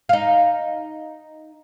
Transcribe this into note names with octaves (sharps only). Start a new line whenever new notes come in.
D#4 F5